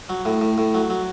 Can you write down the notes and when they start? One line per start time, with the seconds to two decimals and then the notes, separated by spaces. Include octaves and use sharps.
0.09 F#3
0.25 A2
0.41 A2
0.58 A2
0.74 F#3
0.90 F#3